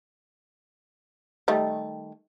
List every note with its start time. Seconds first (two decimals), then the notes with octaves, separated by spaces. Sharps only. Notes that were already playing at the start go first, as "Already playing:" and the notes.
1.48 D#3 G3 A3